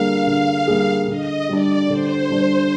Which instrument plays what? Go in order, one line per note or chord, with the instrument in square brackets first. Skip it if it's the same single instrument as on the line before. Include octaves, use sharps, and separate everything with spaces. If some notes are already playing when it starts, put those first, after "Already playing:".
Already playing: [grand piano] D3 G3 A#3 D4 G#4 [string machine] F5
[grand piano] D3
G3 A#3 D4 G#4
[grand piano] D3 [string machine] D#5
[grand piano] G3 D4 [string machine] D5
[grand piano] D3 [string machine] C5
[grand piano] G3 D4